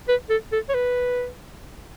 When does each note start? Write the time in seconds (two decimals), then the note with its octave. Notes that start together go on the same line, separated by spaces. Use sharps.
0.09 B4
0.30 A4
0.52 A4
0.69 C#5
0.74 B4